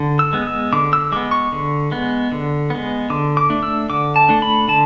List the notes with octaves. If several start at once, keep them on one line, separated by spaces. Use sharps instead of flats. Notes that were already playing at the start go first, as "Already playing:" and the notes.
Already playing: D3
E6
G#3 B3
E6
D3 D6
E6
G#3 B3 D6
C#6
D3
G#3 B3
D3
G#3 B3
D3 D6
D6
A3 D4
E6
D3 D6
A5
A3 D4
B5
D3 A5